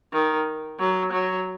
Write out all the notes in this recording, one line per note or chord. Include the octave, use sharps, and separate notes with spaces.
D#3
F#3
F#3